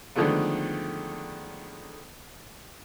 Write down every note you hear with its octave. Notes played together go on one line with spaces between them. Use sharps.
D3 D#3 F3 G#3 A3 B3